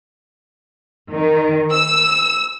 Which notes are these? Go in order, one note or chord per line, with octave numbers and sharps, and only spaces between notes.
D#3
E6